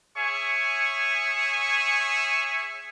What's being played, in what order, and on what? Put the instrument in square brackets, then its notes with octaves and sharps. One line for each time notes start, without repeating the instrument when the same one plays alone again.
[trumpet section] G#4 C#5 E5 G#5 C#6